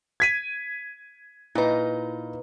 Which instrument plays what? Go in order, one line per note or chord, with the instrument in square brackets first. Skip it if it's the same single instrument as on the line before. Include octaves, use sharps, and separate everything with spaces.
[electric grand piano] G#6 B6 D#7
[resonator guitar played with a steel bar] A#2 D#4 [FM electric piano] E4 B4